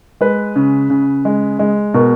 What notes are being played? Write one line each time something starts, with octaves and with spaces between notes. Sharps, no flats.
G#3 B4
C#3
C#3
G#3
G#3
B2 A#4